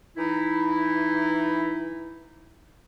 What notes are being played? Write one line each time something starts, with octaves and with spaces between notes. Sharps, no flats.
E3 D#4 E4